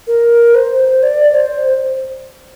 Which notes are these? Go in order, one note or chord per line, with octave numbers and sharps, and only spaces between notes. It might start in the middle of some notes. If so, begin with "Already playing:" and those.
A#4
C5
D5
C5